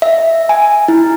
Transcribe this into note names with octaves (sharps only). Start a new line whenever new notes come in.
E5
G#5
E4